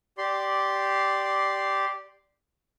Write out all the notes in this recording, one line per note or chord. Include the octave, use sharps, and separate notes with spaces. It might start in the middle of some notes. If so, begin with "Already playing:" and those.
G4 D5 C6